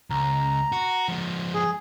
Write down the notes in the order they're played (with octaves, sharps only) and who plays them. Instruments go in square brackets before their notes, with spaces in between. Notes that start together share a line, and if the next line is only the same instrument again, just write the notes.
[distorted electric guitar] C#2 [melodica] A#5
[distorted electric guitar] F#4
F3 G#3
[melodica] G#4